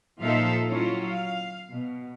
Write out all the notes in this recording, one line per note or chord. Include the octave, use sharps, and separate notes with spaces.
A#2 F3 D#4 A4 E5 F5
F#3 C#4 E4 F4
F5
B2